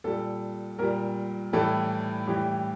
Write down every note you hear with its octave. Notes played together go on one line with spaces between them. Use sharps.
A#2 G3 A4
A#2 G3 A#4
A2 E3 G3 A4
A2 E3 G3 G4